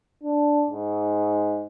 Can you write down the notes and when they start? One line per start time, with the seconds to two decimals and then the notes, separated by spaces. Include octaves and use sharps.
0.24 D4
0.71 G#2